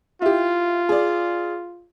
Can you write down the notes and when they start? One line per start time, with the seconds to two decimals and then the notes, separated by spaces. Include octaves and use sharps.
0.22 E4 F4 G4
0.89 G#4 D5